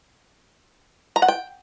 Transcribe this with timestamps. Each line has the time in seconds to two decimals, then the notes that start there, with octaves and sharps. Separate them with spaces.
1.16 A#5
1.22 F#5
1.28 G5